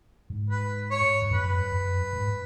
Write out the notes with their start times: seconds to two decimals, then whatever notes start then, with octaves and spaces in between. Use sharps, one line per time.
0.30 G#2
0.50 B4
0.91 C#5
1.22 G#2
1.31 F#2 B4
1.72 F#2
2.13 G#2